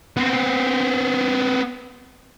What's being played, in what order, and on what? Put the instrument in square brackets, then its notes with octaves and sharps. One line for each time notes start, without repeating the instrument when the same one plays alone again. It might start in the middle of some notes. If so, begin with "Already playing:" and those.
[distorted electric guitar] B3 C4